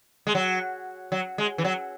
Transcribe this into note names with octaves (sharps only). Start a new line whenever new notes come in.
G#3
F#3
F#3
G#3
E3
F#3